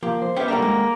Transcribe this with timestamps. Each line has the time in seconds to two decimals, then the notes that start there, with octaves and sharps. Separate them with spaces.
0.03 F3 A#3 G4
0.22 C5
0.36 B3 C#4 G4 E5
0.48 D#3 G3 A#3 D4 A4 F#5 F6
0.62 G#3